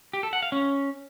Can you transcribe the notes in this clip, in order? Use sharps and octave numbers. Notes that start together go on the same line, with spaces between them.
G4
A4
F#5
F5
C#4